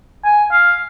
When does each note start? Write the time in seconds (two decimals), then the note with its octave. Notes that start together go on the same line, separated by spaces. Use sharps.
0.25 G#5
0.52 F5